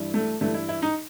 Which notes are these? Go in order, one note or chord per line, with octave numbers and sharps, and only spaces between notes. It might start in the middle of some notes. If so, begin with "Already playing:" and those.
Already playing: G2 E3 G3
A3
G2 E3 G3 A3
E4
E4
D#4